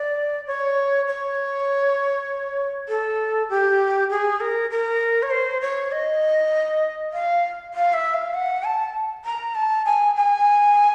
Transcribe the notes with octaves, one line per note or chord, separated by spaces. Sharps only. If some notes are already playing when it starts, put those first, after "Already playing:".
Already playing: D5
C#5
C#5
A4
G4
G#4
A#4
A#4
C#5
C5
C#5
D#5
F5
F5
E5
F5
F#5
A5
A#5
A5
G#5
G#5